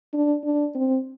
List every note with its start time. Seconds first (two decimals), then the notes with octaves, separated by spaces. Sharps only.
0.13 D4
0.44 D4
0.75 C4